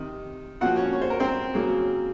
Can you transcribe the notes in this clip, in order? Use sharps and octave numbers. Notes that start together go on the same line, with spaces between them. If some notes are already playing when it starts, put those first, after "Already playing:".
Already playing: C3 D#3
A#2 F3 C4 F#4 F#5
C#4 C#5
C#5
C5
A#4
C4 C5
C#3 F#3 A#3